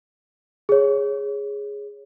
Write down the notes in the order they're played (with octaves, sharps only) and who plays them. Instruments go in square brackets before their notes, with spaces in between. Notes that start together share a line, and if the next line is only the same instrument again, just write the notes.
[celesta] G#4 C#5